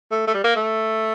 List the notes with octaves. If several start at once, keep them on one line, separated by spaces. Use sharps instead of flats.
A3
A3
G3
A#3
A3